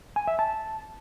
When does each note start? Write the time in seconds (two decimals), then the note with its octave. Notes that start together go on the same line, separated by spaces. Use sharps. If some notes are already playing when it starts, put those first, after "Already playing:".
0.16 G#5
0.27 E5
0.39 A5